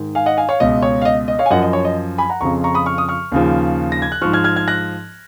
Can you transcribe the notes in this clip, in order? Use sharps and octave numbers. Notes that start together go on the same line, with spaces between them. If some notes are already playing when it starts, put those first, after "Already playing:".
Already playing: G#2 D#3
F5 G#5
D#5 F#5
F5 G#5
C#5 F5
C#2 B2 D#5
C#5
F5
D#5
D#5
C#5 F5
G#5
F#2 F3 D#5 F#5
D#5
C#5
D#5
G#5 B5
F#5 A#5
F2 C#3 F3 A#5 C#6
A#5 C#6
B5 D#6
C#6 F6
D#6
C#6 F6
D#2 C#3 F3
A#6
G#6
F#6
G#2 F3 C#6 F6
F6 G#6
F6 G#6
F6 G#6
F#6 A#6